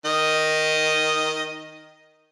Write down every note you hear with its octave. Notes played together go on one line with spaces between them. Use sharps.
D#3 D#5